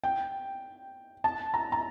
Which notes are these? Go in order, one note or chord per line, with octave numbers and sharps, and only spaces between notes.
G5
A5
A#5
A#5